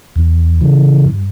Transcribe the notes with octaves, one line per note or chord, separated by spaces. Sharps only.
E2
C#3 E3
G2